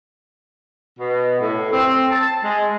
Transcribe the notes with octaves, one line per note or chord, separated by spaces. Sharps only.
B2
A2
C4
A5
G#3